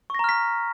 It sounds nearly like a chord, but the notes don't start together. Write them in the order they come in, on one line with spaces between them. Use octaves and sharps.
C#6 A#6 A#5 F6 B6